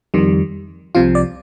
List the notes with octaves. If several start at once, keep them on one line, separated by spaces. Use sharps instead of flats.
F2 D#3 G3
C2 C3 F3 F4
D5